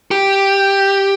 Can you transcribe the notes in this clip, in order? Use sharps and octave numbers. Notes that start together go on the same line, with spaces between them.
G4